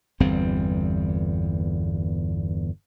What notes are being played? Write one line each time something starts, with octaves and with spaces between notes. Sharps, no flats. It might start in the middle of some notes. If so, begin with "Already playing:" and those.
G1 E2 G3 C4